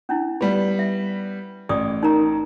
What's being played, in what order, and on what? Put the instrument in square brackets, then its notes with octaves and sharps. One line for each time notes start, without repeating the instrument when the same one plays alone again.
[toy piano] C#4 D4 E4
[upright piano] G3 B3 [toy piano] B5
[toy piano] E5
[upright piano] A1 [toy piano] D5 D6 D#6
[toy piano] D#4 A#4 A#5